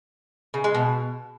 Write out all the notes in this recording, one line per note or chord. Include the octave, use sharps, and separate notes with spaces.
C#3
G#3
B2